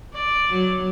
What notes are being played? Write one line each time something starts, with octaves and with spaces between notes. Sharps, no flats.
D5
F#3